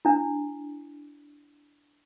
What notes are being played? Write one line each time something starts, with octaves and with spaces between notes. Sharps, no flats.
D4 E4